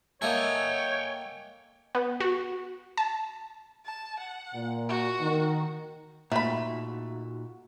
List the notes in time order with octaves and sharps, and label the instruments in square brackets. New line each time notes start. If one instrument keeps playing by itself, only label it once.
[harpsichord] A#3 A4 [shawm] C#5 [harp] D#5 E5 [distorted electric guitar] G5 G#5
[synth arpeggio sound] B3
F#4
A5
[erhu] A5
F#5
[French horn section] A#2
[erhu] F#4
[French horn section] D#3
[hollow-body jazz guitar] A#2 [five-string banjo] A3 B5 [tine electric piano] D#4 F4 F#4